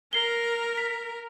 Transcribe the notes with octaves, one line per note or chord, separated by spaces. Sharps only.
A#4 C7 G7
B6